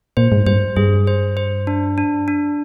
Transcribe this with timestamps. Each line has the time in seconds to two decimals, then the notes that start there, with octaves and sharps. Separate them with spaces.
0.17 A#2 C5
0.32 G#2
0.46 G2 C5
0.76 G2 G#4
1.07 C5
1.37 C5
1.67 D4
1.98 D4
2.28 D4